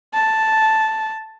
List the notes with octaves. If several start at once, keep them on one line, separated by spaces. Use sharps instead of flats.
A5